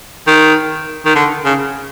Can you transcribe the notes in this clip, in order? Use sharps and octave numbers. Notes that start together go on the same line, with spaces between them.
D#3
D#3
D3
C#3